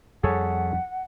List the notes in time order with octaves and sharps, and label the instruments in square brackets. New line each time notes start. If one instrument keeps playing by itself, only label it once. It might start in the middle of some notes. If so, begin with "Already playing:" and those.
[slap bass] F2 G3 [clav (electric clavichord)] G#4 A4 C#5 [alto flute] F#5